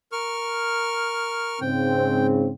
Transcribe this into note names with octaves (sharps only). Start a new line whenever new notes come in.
A#4 C#6 F6
G#2 C#3 C4 G5